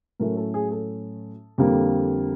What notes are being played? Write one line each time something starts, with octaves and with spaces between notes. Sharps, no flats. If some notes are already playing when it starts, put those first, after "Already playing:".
A2 F#3 A3 C#4 A#4
A4
G#4
A4
F2 D3 G3 A#3